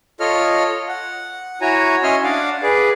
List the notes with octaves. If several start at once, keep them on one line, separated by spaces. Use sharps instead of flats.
F4 A4 C#5 D#5 F6
F#5
E4 F#4 C#5 G#5 A#5
C#4 D#5 E5 G#5 C6 F6
D4 D5 F5 F#5
G#4 B4 D5